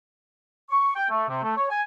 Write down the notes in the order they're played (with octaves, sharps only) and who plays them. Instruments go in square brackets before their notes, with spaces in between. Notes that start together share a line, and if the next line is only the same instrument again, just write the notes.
[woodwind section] C#6
G5
A3
C3
A3
C#5
G#5